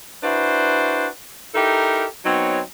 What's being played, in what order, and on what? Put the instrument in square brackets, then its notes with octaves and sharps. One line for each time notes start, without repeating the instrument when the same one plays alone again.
[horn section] D4 E4 F#4 B4 C5
D#4 E4 G4 A4 A#4
F#3 B3 C4 D#4 C#5